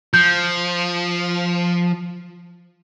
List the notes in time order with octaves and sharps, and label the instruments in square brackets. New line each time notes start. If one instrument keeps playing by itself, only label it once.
[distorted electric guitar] F3 [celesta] G6